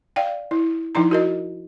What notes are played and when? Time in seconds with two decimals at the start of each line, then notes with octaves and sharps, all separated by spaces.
0.16 D5 F5 G5
0.51 E4
0.95 F3 D#4 E4 A#5
1.11 F#4 A#4 D#5